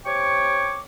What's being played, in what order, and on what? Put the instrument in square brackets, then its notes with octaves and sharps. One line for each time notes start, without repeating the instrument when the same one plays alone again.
[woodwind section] C3 C#5 G5 C#6 D6